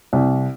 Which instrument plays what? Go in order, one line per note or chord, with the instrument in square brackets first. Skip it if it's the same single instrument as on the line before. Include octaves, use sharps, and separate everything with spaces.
[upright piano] C2